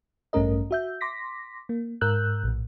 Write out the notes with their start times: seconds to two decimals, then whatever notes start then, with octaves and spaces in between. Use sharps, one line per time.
0.33 A1 G2 A3 C#4 A#4 D#5
0.71 F#4 E5 G6
1.01 C6 D6 A#6 B6
1.69 A#3
2.01 G#2 A#4 E6 F#6 G6
2.44 A#1 A2